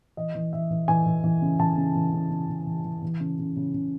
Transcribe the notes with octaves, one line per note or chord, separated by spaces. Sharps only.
E3 D#5
E3
E3 E5
E3
E3 G#5
E3
E3
C#3
E3 A5
C#3
E3
C#3
C#3
C#3
E3
E3
E3
C#3
C#3
C#3
C#3